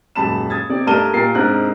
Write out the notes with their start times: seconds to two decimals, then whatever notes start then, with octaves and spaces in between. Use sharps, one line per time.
0.15 D#1 F#2 G#3 A5 B5 E7
0.50 D#6 G#6 A6
0.69 C3 C4 D5
0.86 G2 A3 A#4 A5 D#7 G7
1.13 A#2 G4 A#4 A6 C7
1.35 G#2 C3 C4 D4 A#4 F#6